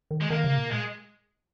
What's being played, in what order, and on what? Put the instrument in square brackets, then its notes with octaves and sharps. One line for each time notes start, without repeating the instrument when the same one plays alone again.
[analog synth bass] D#3
[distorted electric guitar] G#3
[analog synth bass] D#3 [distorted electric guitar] A#3
[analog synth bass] C#3
A#2
[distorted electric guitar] G#3